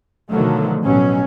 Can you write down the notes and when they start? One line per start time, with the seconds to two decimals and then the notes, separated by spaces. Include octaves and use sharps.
0.30 B2 D3 D#3 F3 F#3 A3
0.84 A1 B2 F#3 C#4